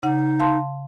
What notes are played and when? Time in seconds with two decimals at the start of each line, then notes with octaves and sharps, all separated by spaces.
0.03 C#3 D#4 F#5
0.40 F5 A5 C6